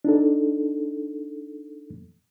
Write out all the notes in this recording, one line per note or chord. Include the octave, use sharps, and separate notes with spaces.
D4 D#4 A4